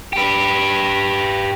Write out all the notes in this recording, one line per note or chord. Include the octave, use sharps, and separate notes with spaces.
G4 B4